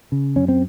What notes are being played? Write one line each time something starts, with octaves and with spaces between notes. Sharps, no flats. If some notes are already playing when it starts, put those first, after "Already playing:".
C#3
F#2 C#4
C4